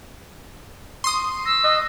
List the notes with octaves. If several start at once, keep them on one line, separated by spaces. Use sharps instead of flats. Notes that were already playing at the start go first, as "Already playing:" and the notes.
C6 C#6 D#6 C7
E6 A#6
D#5 F#6 C7